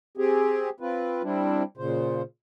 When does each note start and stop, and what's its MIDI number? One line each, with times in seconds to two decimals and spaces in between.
0.17 0.70 60
0.17 0.70 67
0.17 0.70 68
0.80 1.22 60
0.80 1.22 65
0.80 1.22 71
1.23 1.63 55
1.23 1.63 60
1.23 1.63 62
1.23 1.63 64
1.77 2.22 46
1.77 2.22 49
1.77 2.22 72